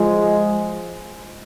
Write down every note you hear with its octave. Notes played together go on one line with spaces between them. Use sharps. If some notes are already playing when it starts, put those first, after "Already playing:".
Already playing: F3 G#3